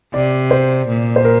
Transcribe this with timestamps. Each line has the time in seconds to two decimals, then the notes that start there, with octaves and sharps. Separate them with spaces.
0.13 C3 D5
0.51 C5
0.88 A#2
1.16 C5
1.25 A#4